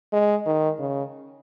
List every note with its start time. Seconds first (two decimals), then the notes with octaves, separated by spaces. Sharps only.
0.13 G#3
0.46 D#3
0.79 C#3